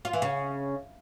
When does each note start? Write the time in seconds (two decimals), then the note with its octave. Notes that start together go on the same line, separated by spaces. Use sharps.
0.05 F4
0.13 E3
0.22 C#3